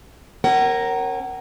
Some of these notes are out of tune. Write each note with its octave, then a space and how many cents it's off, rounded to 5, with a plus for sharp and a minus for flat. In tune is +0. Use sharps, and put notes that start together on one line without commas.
C#4 -30 A#4 +0 F#5 +30